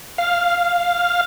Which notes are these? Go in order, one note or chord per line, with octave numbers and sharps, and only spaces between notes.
F5